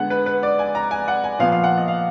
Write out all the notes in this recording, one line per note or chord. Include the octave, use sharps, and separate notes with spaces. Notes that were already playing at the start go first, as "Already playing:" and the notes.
Already playing: D3 G#3 B3 F#5
B4
B4
D5
G#5
A#5
G#5
F#5
G#5
A#2 F3 B3 F5
F5
F#5
D#5
F5